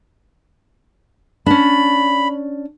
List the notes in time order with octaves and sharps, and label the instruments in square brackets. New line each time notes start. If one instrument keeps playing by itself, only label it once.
[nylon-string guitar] C#4 D4 [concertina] B5